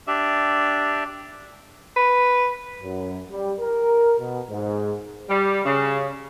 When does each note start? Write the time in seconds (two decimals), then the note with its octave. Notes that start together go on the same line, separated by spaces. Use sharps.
0.07 D4 G4 D5 E5
1.96 B4
2.83 F#2
3.30 G3
3.60 A#4
4.20 B2
4.50 G#2
5.29 G3
5.65 C#3